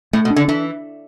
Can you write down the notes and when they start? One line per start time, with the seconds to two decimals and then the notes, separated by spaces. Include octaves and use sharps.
0.13 A2 A3
0.25 B2
0.30 D4
0.36 D3
0.48 E3 D4